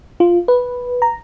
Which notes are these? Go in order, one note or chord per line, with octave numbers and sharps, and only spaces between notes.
F4
B4
A#5